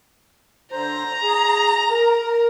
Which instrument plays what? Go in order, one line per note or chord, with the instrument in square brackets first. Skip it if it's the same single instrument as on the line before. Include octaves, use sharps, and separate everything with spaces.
[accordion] D3 C5 [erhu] A#5
[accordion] G#4
A#4